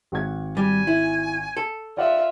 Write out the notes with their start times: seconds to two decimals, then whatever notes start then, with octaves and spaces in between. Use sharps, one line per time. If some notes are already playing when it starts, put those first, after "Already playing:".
0.12 G#1 F#5 G#6
0.57 G3 G#5
0.87 E4
1.57 A4
1.97 F4 D5 E5 F#5